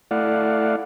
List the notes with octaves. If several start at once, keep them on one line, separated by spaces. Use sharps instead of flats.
A3 E4 D5 F5 F#5